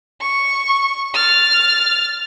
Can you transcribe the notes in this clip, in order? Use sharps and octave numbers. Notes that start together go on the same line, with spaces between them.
C#6
F6 A6